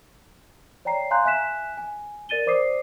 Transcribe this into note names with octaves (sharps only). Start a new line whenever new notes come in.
C#5 D5 G5 A#5 C7
F5 G#5 A#5 C6 F#6 G6
E5 G#5 F#6 B6 E7
G#5
A#4 D5 A6 D#7 G7
C5 D5 D6 D#6 C7